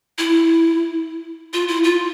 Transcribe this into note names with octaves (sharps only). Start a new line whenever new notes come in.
E4
F4
E4
F4